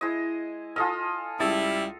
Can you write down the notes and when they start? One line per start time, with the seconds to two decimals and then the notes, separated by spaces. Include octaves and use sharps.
0.01 G#3 E4 D#5
0.76 F4 A4 D#5 G#5 D#6 F6
1.40 C#2 G3 E4 E6 A6